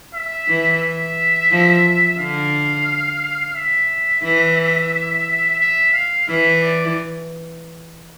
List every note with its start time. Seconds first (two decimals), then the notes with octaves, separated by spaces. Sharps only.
0.14 E5
0.48 E3
0.82 E5
1.51 F3
2.19 D3 F5
3.56 E5
4.23 E3
5.60 E5
5.94 F5
6.28 E3 E5
6.62 D5